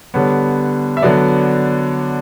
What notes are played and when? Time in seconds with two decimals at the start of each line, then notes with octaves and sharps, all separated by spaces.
0.14 D3 G3 B3 C#5
0.97 E5
1.02 D3 F#3 B3 D5